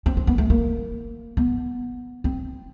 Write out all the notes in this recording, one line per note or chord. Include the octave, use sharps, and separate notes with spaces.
C4
C4
B3
A3
A#3
B3
C4